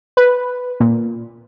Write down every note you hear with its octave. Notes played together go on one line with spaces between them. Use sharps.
B4
A#2